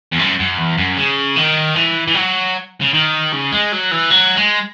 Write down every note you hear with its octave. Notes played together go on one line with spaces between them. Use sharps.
E2
F#2
F#2
E2
F#2
C#3
D#3
E3
E3
F#3
C#3
D#3
C#3
G#3
F#3
E3
F#3
G#3